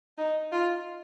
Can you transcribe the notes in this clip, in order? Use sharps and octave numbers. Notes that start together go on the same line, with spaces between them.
D#4
F4